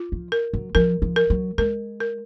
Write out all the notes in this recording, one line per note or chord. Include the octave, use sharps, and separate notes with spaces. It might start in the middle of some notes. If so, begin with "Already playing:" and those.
Already playing: F4
F3
A#4
F#3
F3 A#4
F3
A#4
F#3
G#3 A#4
A#4